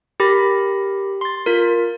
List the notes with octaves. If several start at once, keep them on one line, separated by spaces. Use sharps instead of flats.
G4 A#4 B5 A#6
C6 A6
F4 A#4